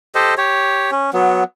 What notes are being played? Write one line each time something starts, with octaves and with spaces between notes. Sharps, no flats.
G4 A4 C5 D#5
G4 C#5
C#4
F#3 B3